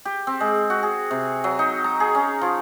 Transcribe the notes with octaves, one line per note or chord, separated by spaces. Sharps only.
G4
C4
G#3
F#4
G#4
C3
F#3
D#4
A#5
G#4
C#4
F3